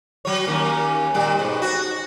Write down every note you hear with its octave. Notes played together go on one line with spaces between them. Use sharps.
F#3 C#5
D#2 A#3 C#4
A#2 D#3 G3
G#2 B2
F#4